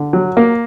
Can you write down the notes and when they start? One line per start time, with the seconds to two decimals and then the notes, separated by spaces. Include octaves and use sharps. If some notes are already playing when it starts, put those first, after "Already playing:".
Already playing: D3
0.13 F#3
0.37 A#3